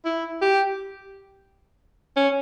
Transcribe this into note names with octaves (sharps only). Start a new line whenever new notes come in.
E4
G4
C#4